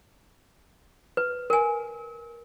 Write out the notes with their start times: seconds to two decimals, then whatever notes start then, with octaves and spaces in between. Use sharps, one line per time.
1.17 B4
1.50 A#4 G#5